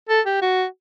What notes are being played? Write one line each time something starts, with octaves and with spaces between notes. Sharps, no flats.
A4
G4
F#4